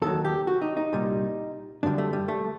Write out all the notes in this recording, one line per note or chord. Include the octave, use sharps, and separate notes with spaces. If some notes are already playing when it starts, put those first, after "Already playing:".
D#2 D#3 F#3 A4
G4
F#4
D#4
D#4
C2 A#2 G3
F#2 D3 G3 D4
A3
G3
A3